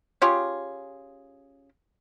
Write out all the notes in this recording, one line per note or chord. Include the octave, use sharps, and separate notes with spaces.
C#4 F4 G4 G#4